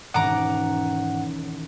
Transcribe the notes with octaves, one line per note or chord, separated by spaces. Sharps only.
E1 G#2 D#3 C#4 F#5 A#5 D6